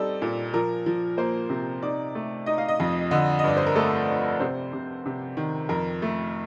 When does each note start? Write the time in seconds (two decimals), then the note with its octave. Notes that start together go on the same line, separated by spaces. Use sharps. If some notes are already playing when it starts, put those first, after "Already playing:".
Already playing: G3 C4 D#4 A4 D5
0.22 A#2
0.54 F3 A#4
0.86 F3
1.17 A#3 C5
1.50 C3
1.82 D#4 D5
2.15 A3
2.46 D#4 D#5
2.58 F5
2.68 D#5
2.80 F2
3.11 D3 D#5
3.39 D#5
3.44 G2 D5
3.57 C5
3.66 A#4
3.75 A3 A4
4.08 D4
4.40 C3 C5
4.73 C3
5.06 C3
5.37 D#3
5.69 F2 A#4
6.02 A3